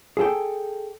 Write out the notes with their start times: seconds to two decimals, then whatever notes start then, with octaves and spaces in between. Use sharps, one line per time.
0.17 G#4 A4 G5